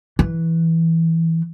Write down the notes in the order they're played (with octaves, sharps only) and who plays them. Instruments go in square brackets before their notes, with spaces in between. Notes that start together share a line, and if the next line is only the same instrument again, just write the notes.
[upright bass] E3